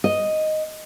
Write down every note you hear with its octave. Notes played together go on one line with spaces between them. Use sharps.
D#5